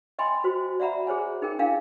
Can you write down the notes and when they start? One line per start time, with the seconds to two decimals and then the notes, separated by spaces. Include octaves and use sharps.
0.19 D#5 G5 G#5 B5 C6
0.44 F#4 C5
0.80 D5 E5 F#5 A#5 B5
1.07 G#4 C5 C#5 G#5
1.42 D#4 G#4 A#4 G5
1.59 D4 E4 A#4 F5 G5 G#5